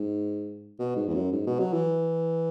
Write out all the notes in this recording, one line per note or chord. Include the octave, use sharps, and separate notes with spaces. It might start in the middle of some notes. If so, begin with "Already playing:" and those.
Already playing: G#2
B2
G#2
E2
F#2
G#2
B2
F#3
E3